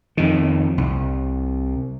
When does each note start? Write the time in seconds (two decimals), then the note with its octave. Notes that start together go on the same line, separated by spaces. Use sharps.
0.17 F2 D#3
0.78 C2